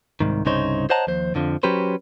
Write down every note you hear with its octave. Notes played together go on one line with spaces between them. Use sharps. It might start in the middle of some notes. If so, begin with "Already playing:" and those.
C2 G#2 D#3
C2 G2 C#3 D#4 C5 C#5
C5 C#5 D#5 F#5 A5 A#5
D#2 F3 C5
F2 D3 F3
F#3 C#4 G4 B4 C5